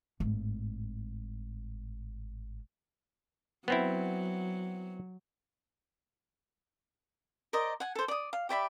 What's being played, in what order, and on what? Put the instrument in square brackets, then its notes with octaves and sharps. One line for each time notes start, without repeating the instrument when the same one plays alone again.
[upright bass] G#1 A2
[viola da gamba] F#3 [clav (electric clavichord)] B3 C4 E4
[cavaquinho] A#4 C5 D5 D#5
F#5 G#5
A4 C5
D5 D#6
F5
G4 D5 E5 B5